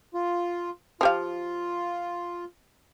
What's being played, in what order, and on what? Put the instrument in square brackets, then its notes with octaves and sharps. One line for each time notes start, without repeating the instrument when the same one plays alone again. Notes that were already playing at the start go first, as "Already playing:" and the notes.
[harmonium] F4
[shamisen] F3 G4 F5 [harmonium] F4